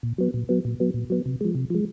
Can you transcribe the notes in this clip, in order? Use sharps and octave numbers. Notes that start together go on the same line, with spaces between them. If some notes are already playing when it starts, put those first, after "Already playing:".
A#2
F#3 B3
A#2
F#3 B3
A#2
F#3 B3
A#2
F#3 B3
C3
F3 G#3
C3
F3 G#3